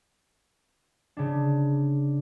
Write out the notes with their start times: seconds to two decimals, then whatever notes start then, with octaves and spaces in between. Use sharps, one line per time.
1.17 C#3 D4